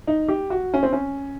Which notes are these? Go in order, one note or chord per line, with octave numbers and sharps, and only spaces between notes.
D#4
G4
F#4
C#4
C4
C#4